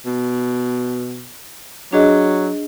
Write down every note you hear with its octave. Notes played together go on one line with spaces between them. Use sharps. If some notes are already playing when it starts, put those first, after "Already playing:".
B2
F#3 D4 G#4 D#5